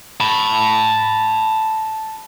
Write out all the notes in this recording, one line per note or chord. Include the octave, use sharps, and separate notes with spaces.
A5 B5